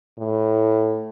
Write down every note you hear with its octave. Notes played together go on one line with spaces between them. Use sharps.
A2